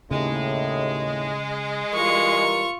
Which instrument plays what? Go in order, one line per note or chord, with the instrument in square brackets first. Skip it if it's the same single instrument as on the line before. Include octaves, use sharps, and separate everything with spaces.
[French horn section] D#2 A2 [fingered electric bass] C#3 [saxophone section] G#3
[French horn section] E3 G3 A#4 [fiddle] F4 C#6